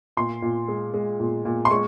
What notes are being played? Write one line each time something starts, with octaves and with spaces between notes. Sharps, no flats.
A#2 C6
A#2
G#3
G#3
A#2
A#2
C6
G#3 C#6